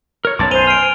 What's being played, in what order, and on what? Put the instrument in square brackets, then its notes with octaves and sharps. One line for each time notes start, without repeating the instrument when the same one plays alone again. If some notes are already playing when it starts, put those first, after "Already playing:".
[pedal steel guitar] A#4 C#5
[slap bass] B1 F#2 [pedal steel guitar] C#5 A5 D6 [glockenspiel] C6
[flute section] C5 [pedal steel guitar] G#5 [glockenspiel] D#7 F7 G7
[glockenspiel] F6 D7